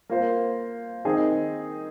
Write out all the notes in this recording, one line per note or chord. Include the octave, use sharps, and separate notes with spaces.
A#3 F4 C5
D#3 C4 D#4 G#4